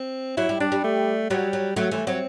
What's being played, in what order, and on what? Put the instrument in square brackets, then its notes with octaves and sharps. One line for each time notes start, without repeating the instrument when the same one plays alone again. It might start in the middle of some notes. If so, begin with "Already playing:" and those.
Already playing: [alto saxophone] C4
[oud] F#3 [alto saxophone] E4
[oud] G3
[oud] G3 [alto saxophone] D4
[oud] G3
[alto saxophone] A3
[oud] F#3 [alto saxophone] G3
[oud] F#3
[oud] F#3 [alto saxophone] A3
[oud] E3 [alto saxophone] A3
[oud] F#3 [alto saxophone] C4